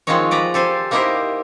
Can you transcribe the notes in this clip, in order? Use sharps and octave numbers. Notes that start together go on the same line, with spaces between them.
D#3 F3 G#3 C4 D#4 C#5
B4 D5 A#5
G4 A4 C5 G#5
A#3 D#4 E4 G4 A#4 C5